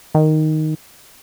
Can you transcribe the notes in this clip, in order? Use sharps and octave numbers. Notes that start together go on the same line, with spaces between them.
D#3